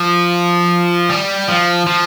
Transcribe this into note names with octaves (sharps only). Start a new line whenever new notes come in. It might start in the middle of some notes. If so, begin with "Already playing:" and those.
Already playing: F3
G3
F3
F3